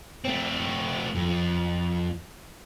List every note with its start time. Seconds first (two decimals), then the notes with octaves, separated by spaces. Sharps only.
0.24 A3 C4
1.15 F2